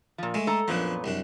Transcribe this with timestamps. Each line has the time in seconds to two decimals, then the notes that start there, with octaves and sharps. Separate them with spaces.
0.18 A#2 F3
0.34 G#3 A3
0.47 A4 A#5
0.68 F#2 A#2 F3 B3 D4
1.04 C2 F#2 D4